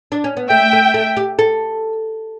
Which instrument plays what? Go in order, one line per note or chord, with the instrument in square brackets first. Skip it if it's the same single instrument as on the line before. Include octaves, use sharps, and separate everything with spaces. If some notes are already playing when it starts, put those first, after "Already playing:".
[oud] D4
C#4
B3
[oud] A3 [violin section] E5 G5
[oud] A3
A3
G4
A4